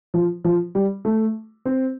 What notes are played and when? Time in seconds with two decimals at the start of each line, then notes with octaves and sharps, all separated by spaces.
0.14 F3
0.44 F3
0.75 G3
1.05 A3
1.66 C4